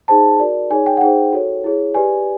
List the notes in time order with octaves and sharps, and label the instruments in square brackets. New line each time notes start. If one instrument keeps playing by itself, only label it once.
[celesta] D#4 G#4 C5 A5
F#4 A#4 D5
D#4 G#4 C#5 G#5
G5
F#5
D#4 G#4 C5 G5
F#4 A4 C#5
E4 G#4 C#5
G4 B4 D5 G#5